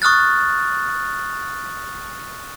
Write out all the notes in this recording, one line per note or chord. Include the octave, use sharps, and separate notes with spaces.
C#6 D#6 F6 F#6 A6